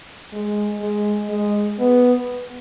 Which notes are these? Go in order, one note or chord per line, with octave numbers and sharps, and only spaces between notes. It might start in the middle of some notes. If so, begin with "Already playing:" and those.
G#3
G#3
G#3
B3